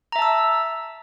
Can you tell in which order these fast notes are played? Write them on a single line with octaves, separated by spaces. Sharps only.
A#5 E5 A5 E6